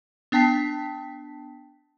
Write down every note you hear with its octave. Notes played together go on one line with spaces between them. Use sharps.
B3 D4 G5 A5 B6